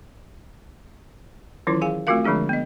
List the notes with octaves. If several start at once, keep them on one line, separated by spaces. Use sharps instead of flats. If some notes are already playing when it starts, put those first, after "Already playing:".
D#3 E3 F#3 C#4 E4 F4
G#4 F5 G#5
A3 C4 F4 F#4 A#4 F5
D3 F3 G#3 D4 G#4
B3 D#5